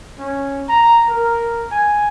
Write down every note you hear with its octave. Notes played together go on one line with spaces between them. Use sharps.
C#4
A#5
A#4
G#5